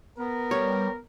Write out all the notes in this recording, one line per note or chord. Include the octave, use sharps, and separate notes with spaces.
B3 A#4
G3 C#5